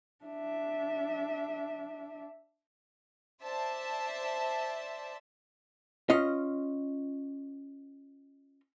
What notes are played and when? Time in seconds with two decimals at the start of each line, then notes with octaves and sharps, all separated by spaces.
0.25 D4 E5
3.43 C5 D5 E5 A5
6.10 C#4 F4 D#5